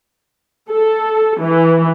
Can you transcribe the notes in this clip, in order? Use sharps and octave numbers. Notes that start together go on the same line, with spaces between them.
A4
E3